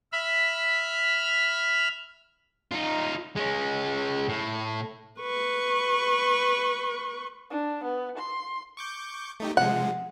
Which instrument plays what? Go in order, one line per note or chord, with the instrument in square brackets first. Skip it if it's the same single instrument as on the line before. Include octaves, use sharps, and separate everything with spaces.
[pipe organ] E5 B5 F6
[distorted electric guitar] D#4 F4
G#3 C#4
A2
[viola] B4 C#6
[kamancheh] D4
B3
C6
[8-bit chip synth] C#6 D6 G6
A3 D#4 G4
[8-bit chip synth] C3 F3 G#3 [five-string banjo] F#5